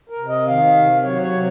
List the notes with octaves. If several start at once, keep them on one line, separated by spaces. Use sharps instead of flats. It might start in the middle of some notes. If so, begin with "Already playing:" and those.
A#4
C3
D#5
D#3 F5
C3
F#3 C#5
C#5
C3